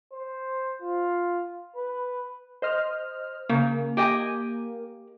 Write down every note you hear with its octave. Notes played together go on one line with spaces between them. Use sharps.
C5
F4
B4
C5 D#5 F6
C#3 A#3
G4 D#5 G#5